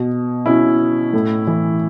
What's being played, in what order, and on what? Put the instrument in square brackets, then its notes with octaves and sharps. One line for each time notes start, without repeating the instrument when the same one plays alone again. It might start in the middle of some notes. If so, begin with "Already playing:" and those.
Already playing: [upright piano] B2
B2 C#4 E4
A2
E3